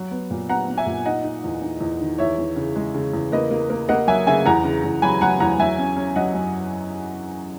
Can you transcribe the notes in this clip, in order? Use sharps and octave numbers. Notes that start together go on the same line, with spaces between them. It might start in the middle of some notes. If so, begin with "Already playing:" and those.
Already playing: F#3
B3
A#2
B3 F#5 A#5
B3
E5 G#5
A#2
D#4 D#5 F#5
D#4
E2
D#4
E2
D#3
E2 C#5 E5
E3
C#3
G#3
C#3
E2
A#3 B4 D#5
A#3
A#3
A#3 D#5 F#5
F#3 E5 G#5
C#3 E5 G#5
E2 F#5 A#5
C#3
E2
F#3 G#5 B5
F#3 F#5 A#5
E2 F#5 A#5
F#3 E5 G#5
C#4
C#4
F#3 D#5 F#5
F#2